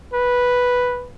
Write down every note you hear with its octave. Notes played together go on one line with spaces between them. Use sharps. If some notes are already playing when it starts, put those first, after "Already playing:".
B4